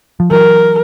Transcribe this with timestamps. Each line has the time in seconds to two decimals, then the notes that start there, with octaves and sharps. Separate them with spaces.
0.20 F3
0.31 E3 F#3 A#4